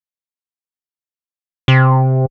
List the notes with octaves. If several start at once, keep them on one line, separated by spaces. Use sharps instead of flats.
C3